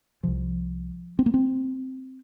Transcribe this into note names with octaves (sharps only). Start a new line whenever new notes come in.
C2 C3 F3
C4
A#3
C4